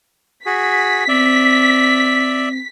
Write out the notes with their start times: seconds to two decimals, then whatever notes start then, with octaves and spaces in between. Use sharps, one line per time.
0.46 F#4 G#4 B6
1.08 C4 D5 E5